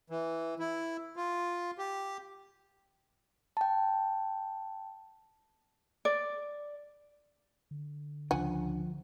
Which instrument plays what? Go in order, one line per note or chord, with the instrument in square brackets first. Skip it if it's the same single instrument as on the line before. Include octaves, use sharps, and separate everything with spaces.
[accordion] E3
E4
F4
G4
[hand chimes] G5 A5
[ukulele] D5
[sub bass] D3
[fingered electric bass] C#2 C#3 D4 [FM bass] F3 [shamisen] F#5 G#5